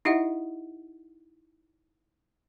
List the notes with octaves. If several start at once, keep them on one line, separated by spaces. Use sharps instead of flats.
D#4 E4 G4 D#5 E5 F#5